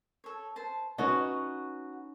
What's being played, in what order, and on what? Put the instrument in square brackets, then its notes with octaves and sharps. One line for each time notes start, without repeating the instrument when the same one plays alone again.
[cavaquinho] A4 C#5
C5 A5
[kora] C#4 D#4 [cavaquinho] F#4 B4